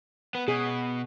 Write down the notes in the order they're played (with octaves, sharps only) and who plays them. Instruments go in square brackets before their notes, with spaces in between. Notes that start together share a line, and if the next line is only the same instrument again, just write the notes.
[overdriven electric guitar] B3
[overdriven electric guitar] B2 [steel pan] G#4